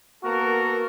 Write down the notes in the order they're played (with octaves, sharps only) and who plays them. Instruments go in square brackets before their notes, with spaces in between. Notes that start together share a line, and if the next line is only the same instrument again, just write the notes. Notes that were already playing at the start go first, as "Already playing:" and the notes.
[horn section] A#3 B3 F#4 A4 A#4